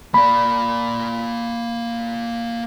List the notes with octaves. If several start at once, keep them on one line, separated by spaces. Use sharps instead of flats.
A#3 D5 B5